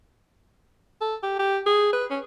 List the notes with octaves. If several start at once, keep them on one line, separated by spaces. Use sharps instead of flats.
A4
G4
G4
G#4
B4
C#4